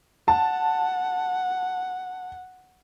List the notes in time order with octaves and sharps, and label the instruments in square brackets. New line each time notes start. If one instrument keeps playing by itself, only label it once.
[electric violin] F#5 [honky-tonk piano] A5